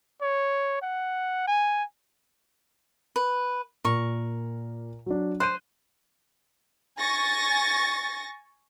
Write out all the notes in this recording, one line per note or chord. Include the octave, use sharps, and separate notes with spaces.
C#5
F#5
G#5
B4
A#2 A#4 C#6
F#3 D4
C5 F#6 G6 D#7
G#5 C#6 A6 A#6